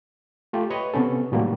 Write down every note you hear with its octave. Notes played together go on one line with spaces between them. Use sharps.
A3 F4 G4
B4 C#5 D#5 C#6
C3 B3 C#4 A4
A2 D#3 F#3 G3 A3 A#3